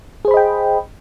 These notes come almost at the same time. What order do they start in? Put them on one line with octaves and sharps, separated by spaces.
G#4 C5 B5 D#5 G5